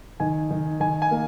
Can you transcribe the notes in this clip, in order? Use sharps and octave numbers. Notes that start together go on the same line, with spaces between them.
D#3 G#5
D#3
D#3 G#5
G#5
A#3